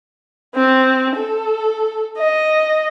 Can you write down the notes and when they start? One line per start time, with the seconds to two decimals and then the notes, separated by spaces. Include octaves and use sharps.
0.55 C4
1.16 A4
2.18 D#5